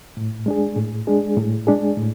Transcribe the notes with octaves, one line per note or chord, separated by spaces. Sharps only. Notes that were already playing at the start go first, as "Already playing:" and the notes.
A2
G#3 D4 G#4
A2
G#3 D4 G#4
A2
G#3 D4 G#4
A2